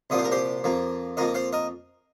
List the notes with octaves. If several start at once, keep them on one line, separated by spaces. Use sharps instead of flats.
C2 A#2 F3 A#3 D#5
C5
A#4
G4 C5
F2 F3 A#3
F2 F3 A#3 A#4 D#5
C5 F5
A#4 D#5